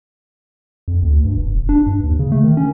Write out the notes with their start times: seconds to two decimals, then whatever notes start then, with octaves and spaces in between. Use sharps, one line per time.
0.88 F2
1.03 D2
1.25 G2
1.38 F1
1.55 F1
1.69 D4
1.87 G2
2.03 D#2
2.19 C#3
2.32 A3
2.44 D#3
2.57 C#4